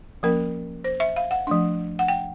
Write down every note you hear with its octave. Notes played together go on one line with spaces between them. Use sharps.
F3 A#3 C#4 A#4
C5
E5
F5
F#5
F3 A3 D4
F#5
G5